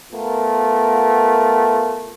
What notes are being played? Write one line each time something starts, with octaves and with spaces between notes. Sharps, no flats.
A3 B3 F4 A#4